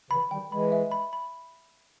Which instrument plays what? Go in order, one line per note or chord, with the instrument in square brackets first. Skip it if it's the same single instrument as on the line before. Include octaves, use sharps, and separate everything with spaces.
[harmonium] C#3 E3 [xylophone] B5
[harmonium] D#3 G3 [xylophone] G5
[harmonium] E3 G#3 [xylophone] B5
[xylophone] E5
B5
B5